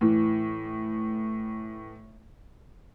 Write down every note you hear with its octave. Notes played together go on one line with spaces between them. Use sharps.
A2 E3